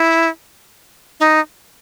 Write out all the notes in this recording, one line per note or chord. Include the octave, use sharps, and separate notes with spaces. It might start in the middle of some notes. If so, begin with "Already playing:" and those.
Already playing: E4
D#4